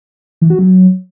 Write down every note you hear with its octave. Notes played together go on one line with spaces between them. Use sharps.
E3
F#4
F#3